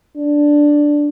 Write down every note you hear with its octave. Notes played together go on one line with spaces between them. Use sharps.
D4